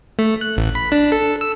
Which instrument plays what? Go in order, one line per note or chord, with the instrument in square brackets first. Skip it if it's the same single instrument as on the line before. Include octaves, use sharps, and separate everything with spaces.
[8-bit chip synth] A3
F#6
A1
B5
D4
A4
E6